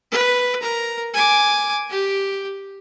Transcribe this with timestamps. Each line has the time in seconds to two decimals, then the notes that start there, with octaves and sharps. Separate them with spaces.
0.11 B4
0.62 A#4 A#5
1.14 G#5 D6
1.90 G4